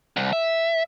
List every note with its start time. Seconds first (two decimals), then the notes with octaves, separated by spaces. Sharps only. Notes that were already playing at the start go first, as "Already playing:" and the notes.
0.17 C2
0.33 E5